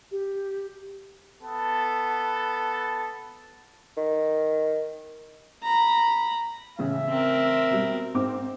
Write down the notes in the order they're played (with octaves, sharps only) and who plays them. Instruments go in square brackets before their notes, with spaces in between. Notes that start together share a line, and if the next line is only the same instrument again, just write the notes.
[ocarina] G4
[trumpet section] B3 A4
[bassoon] D#3
[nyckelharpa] A#5 B5
[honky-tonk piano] A1 C#3 [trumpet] E5
[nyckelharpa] C4 A#4
[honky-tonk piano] B2 G3
G#2 C4 D6